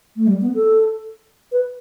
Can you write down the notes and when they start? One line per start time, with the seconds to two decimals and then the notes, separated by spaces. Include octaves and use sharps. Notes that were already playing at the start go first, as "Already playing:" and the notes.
0.17 A3
0.27 G3
0.42 B3
0.55 A4
1.52 B4